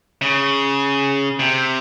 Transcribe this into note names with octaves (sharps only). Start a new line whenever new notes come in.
C#3
C3